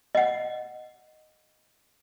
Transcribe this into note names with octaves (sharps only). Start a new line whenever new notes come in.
D#5 F#5